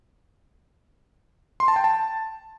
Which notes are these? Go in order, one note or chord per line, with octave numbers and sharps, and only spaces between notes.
C6
A5
G5
A5